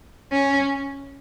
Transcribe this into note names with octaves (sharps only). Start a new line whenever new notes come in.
C#4